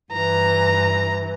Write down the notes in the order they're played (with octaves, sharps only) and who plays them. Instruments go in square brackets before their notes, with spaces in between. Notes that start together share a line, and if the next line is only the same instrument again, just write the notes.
[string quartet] G2 E3 [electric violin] A#5